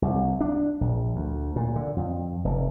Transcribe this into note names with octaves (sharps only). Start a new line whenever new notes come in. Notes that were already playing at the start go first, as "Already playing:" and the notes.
C2
D4
A#1
D2
A#2
D3
F2
F1